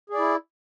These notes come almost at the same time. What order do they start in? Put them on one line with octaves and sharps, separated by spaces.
G#4 D5 E4